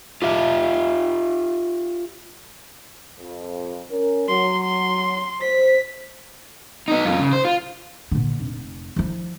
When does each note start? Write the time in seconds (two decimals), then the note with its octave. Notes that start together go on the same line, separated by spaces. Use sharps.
0.22 F4 G4 E5
3.18 F2
3.91 C#4 A#4
4.29 F#3 C6
4.64 C6
5.41 C5 B6
6.88 B3 D#4
7.05 F#2 F4
7.20 C#3
7.33 C5
7.45 F4
8.12 A#2 D3
8.40 F1
8.96 F3 E4